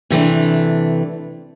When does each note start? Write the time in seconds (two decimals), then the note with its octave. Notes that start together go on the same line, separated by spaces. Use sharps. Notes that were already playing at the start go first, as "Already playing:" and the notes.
0.10 C3 E3 A3 D4